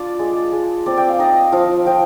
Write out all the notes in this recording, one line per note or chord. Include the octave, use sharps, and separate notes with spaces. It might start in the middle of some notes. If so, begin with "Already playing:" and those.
Already playing: D4 F4 D5
G#3
G#3
C4 D5
G5
F5
D#4 D#5
F3 F5
F3 G5